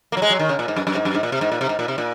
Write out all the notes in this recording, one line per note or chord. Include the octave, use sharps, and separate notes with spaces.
A#3
F#3
G#3
F#3
D#3
C#3
A#2
G#2
F#2
F#2
G#2
F#2
G#2
A#2
C3
G#2
A#2
C3
G#2
A#2
C3
A#2